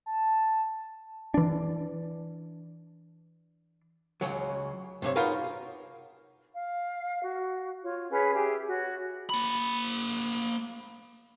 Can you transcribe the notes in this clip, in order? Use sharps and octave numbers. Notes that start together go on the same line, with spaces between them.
A5
E3 D4
C#2 C#3 F#3
G2 C3 C#5
D#4 F4 F#4 G#4 A#4 B4
F5
F#4
F4 C#5
C#4 G#4 B4 C#5
G4 G#4 E5
F#4 C#5
A#3 B5